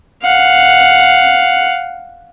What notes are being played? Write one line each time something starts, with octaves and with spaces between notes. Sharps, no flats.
F5 F#5